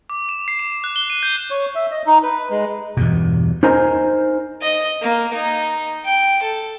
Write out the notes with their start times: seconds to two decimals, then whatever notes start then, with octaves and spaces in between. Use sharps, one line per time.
0.10 D6
0.29 E7
0.48 C7
0.59 E7
0.72 E7
0.84 F#6
0.96 G7
1.10 D#7
1.23 G6
1.50 C#5
1.75 E5
1.91 D#5
2.06 D#4
2.23 B4
2.50 G#3
2.97 E2 G2 B2
3.63 D#4 A#4 C5 G#5 A#5
4.62 D#5
5.01 A#3
5.33 D#4
6.05 G5
6.42 A4